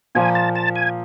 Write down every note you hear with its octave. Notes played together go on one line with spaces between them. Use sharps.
A#2 F3 A#3 G#5
A5
A5
G#5